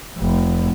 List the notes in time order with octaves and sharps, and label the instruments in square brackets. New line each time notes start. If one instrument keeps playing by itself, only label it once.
[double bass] F1